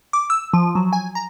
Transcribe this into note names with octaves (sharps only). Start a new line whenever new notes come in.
D6
E6
F3
F#3
G#5
A#5